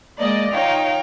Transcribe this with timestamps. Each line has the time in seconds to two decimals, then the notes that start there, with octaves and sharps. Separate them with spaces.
0.19 G#3 A#3 D5 D#5
0.52 D#4 F4 C#5 F5 G5